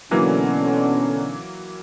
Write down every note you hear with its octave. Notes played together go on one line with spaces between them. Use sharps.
B2 D3 E3 F#3 A#3 C#4